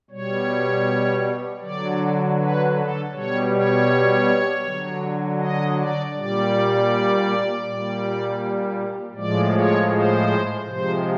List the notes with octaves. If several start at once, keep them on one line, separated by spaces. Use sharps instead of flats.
B2 G3 C#5
D3 F#3 D5
B4
A4
B2 G3 C#5
C#5
D3 F#3
D#5
D5
A#2 G3 D5
A#2 G3
A2 F3 G#3 D5
C#5
C5
C3 F3 G#3 C5